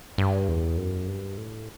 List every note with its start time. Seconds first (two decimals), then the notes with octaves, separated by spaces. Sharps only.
0.18 G2
0.48 E2
0.77 F#2
1.08 G2
1.38 A2